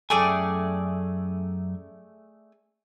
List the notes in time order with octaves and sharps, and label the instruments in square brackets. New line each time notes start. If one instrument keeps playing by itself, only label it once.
[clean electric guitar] F#2 G5 G#5 [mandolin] A3 G#4 D5